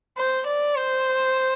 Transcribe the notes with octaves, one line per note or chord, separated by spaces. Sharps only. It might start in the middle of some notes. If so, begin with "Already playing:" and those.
C5
D5
C5